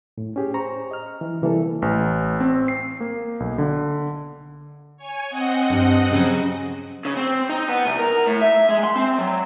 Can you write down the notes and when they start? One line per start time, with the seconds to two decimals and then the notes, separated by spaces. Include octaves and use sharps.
0.18 A2
0.36 C#4 G4 G#4
0.54 C5 A#5 C#6
0.91 D#5 F6
1.21 E3
1.42 C3 E3 G3 A#3 A4
1.82 A1
2.40 C4
2.68 C7
3.00 A#3
3.40 B1
3.58 D3
4.97 C#5 G#5
5.29 C4 D#5 F#5
5.70 G2
6.11 C#3 F#3
7.05 C#3
7.17 C4
7.49 D#4
7.69 B3
7.86 C2
7.99 A#4
8.27 A2
8.41 E5
8.69 G#3
8.84 C6
8.96 C4
9.18 F#3